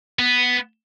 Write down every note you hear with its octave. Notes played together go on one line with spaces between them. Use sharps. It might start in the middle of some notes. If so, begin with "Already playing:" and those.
B3